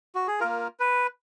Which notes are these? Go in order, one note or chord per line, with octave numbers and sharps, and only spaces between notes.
F#4
G#4
A#3 F4 A#4
B4